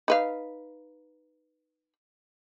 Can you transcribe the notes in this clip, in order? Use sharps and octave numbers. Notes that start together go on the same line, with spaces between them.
D#4 B4 F5